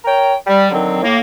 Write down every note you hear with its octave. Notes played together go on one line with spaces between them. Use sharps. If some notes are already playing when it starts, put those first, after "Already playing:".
A#4 C#5 G5
G3
D3 D#3 F#3 C4
A2 A#3